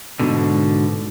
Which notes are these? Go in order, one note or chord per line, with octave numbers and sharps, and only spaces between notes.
G#2 B2 D3